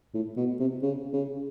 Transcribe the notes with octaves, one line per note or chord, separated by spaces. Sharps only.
A2
B2
C3
C#3
C#3